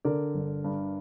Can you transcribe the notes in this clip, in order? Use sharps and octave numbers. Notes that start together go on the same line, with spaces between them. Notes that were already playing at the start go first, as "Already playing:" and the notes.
D3 A#4 D5
G1
G2